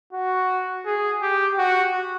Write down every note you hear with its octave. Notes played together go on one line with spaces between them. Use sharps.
F#4
G#4
G4
F#4